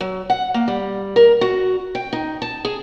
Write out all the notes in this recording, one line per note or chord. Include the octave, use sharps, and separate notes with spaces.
F#3
F#5
A#3
G3
A#4
F#4
G5
D#4
A5
G#4